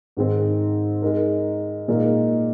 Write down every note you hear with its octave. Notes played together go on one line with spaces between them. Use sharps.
G#2 D#3 G#3 C4
G#3 D#4 A#4
A#2 G#3 D#4 A#4